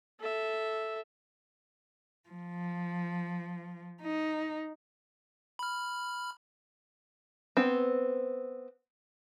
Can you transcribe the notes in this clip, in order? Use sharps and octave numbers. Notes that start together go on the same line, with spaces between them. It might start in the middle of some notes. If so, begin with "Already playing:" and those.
A4 E5
F3
D#4
B5 F6
B3 C4